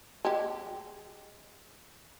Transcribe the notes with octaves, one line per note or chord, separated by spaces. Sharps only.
G#3 G4